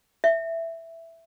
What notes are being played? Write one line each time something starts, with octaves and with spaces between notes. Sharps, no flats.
E5